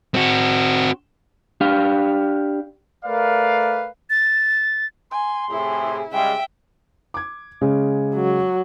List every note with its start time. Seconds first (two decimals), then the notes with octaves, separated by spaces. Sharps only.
0.14 C4 F#4
1.61 D4 G4 F5
3.05 A3 A#4 B4 D5 F5
4.10 A6
5.11 G#5 C6
5.51 A2 C3 E4 G#4
6.12 C#3 G3 G#3 E5 G5
7.14 D6 G#6
7.61 C#3 G#3 C#4
8.15 F#3